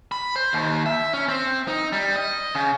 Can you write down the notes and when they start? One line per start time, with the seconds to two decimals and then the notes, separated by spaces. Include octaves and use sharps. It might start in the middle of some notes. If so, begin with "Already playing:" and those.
0.12 B5
0.36 C5
0.53 D#2
0.86 E5
1.13 C#4
1.28 C4
1.68 D#4
1.92 G3
2.16 D#5
2.55 C#3